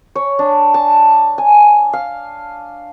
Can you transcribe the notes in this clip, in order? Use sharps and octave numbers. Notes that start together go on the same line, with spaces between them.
C#5
D4
A5
G#5
F5